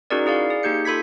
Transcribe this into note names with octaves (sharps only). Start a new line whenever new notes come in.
C#4 D#4 F#4 G#4 A#4 D5
E4 G#4 D5 F5
G#4
A#3 D#4 G4 G6 C#7
F4 A4 B5 G#6 B6